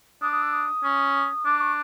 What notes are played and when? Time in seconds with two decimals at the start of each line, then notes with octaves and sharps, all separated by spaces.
0.22 D4 D#6
0.32 D#6
0.43 E6
0.53 D#6
0.84 C#4
1.45 D4 D6
1.61 C#6